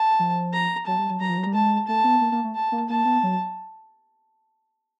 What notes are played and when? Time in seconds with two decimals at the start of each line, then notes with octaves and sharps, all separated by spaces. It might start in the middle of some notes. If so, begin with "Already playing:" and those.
Already playing: A5
0.19 F3
0.53 A#5
0.86 F#3 A5
0.98 G3
1.10 F#3
1.20 F#3 A#5
1.29 F3
1.37 F#3
1.46 G3
1.54 G#3 A5
1.88 A3 A5
2.04 B3
2.21 A#3
2.32 A#3
2.44 A3
2.55 A5
2.72 A#3
2.89 A#3 A5
3.05 B3
3.23 F#3